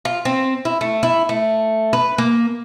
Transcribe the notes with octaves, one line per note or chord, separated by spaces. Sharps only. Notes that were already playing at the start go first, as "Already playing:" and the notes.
F4
C4
E4
A3
E4
A3
B4
A#3